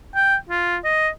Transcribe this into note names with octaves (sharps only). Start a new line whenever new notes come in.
G5
F4
D#5